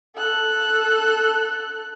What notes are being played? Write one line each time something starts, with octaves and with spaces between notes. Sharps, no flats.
A4 F#6